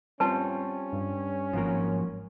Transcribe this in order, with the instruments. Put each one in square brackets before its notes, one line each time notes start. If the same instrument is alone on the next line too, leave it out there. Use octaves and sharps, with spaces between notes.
[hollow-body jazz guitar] G3 C4 F4 [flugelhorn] C#4 [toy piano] B4 A5
[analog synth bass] G2
[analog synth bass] G#1 [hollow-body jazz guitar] F3 F#3 A#3